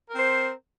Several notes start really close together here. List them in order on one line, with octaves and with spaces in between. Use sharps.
A#4 C4 C5